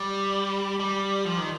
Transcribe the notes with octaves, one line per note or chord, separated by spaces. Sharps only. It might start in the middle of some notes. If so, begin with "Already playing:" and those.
Already playing: G3
G3
F3
D#3